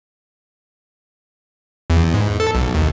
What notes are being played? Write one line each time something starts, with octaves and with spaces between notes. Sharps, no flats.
E2
G#2
A4
B1
D#2